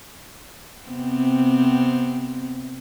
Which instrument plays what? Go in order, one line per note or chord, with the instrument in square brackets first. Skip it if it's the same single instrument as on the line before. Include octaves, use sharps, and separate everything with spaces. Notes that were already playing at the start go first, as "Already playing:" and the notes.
[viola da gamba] C3 B3 C4